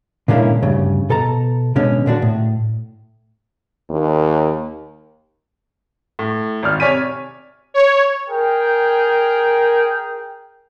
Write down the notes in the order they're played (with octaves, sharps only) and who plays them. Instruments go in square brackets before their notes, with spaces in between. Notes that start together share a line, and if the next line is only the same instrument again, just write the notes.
[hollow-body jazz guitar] A#2 D3 G#3 A#3 C#4 E4
D2 G2 C#3
B2 A4 A5 A#5
B2 D3 G#3 C#4
A#2 D3 D4 F#4
A2
[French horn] D#2
[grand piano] A2
G#1 D5 F6
C3 C#5 D5 G#5 B6 D#7
[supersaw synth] C#5
[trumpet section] G#4 A#4 G5